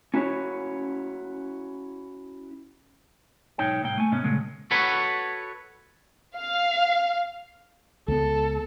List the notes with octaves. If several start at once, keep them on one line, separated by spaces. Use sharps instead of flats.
C#4 E4 F#4 C5 C#5
B1 G#2 D#4 C#5 G5
C2 A2 A#3 G5
A3 G#5
G#2 C3 B3 C#4
A#2 C#3 G#3 A3
F#4 A4 B4 C#5
F5
C#2 B3 A4